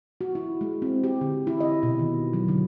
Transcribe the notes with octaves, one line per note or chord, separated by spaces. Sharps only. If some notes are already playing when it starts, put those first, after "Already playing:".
F#4
E4
G#3
C4
G4
D3
E4
D#5
B2
D#3
F#3
D3